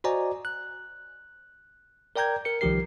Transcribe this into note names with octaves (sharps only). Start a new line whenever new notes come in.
F#4 C5 D5 D#5 G#5 A#5
F#6
A#4 D5 G5 A#5 G6 G#6
A#4 C#7
C2 D#3 F3 G4 A#4 C7